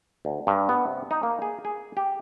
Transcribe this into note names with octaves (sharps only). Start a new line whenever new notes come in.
D2
G2
B3
C3
D#4
A#3
G#4
G#4
G4